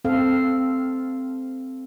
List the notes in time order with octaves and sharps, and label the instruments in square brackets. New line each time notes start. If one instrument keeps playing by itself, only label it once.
[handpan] C4 A4 F5